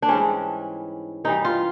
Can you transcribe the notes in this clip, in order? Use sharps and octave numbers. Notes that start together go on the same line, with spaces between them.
D4
G#2 E3 G3 C#4
G2 E3 G3 D#4
F4